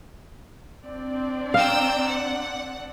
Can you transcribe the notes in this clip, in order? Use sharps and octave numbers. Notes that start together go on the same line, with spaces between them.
C4 D4 D5
F5 G5 A#5 E6
F#5